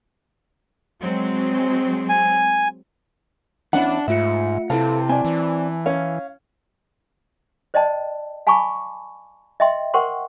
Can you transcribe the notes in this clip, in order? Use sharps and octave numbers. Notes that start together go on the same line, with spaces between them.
F#3 G#3 C4
G#5
E2 C#4 D4 E4 F#5
G#2 A3 F4 E5 C#7
C3 E4 A4 B4 F5 A5
C4 D5 G#5
E3
C#4 F5
C5 D5 D#5 G5 A5
F5 G#5 A5 B5 C#6 D6
D#5 E5 G5 C6
A#4 C5 F#5 G5 C6 C#6